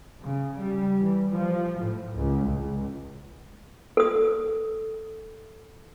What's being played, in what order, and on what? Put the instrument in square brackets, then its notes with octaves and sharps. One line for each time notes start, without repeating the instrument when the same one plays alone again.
[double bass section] C#3
G3
E3
F3
A2
C#2
C#2
[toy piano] A4 D#6